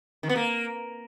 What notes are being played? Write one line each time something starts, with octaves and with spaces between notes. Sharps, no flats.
D#3
B3
A#3